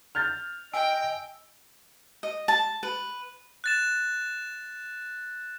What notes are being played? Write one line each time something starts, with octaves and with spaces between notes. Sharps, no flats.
F6 G6 A6 F7
D#5 G5 G#5 E6 D7
D#5
A5
B4
F#6 A6 E7